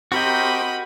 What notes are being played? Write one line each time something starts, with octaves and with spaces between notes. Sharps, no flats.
C4 F#4 G4 A#4 D#5 G5 B5